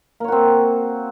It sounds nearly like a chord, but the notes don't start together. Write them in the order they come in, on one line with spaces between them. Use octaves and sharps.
A#3 C#5 F#4 C4